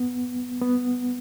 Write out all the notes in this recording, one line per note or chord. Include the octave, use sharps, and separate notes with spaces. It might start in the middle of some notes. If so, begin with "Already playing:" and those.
Already playing: B3
B3